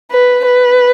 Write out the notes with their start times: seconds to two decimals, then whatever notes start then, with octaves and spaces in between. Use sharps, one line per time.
0.11 B4
0.45 B4